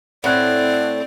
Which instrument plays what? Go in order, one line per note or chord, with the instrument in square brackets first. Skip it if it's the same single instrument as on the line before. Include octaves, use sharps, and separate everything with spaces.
[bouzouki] A2 A4 [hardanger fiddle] C4 [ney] D5 [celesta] F#5 F#6 G#6